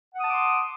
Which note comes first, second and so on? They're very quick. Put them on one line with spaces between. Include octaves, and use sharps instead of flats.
F#5 D#6 A5 D6 C6